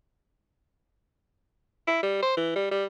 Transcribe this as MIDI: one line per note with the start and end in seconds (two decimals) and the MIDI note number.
1.88 2.01 64
2.03 2.18 55
2.22 2.37 72
2.37 2.52 52
2.56 2.66 55
2.71 2.85 55